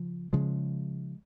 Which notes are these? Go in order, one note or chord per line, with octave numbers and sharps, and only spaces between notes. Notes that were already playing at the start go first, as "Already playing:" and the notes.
Already playing: C#3 F3
C#3 F3 G#3